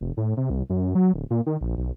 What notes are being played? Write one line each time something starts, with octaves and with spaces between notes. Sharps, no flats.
F1
A2
C3
C2
F#2
F#3
D1
A#2
D#3
A#1
B1